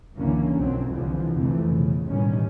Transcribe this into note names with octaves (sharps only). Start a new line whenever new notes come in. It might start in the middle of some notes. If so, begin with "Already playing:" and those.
C#2 F#2 D3 E3 A#3 C#4
B1 F2 F#3 C4
C2 D3 E3 F3
F2 C3 E3 A3
B1 C#3
A1 B2 D#3 G3 C#4